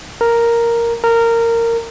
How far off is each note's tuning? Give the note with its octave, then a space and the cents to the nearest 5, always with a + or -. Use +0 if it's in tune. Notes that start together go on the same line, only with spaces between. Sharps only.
A#4 +0
A#4 -15